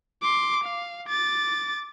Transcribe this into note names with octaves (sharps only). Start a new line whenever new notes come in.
C6 D6
F5
D6 A6